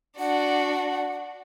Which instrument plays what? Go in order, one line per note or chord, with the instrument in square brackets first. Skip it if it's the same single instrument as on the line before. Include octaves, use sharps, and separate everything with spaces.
[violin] D4 F#4 [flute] F#5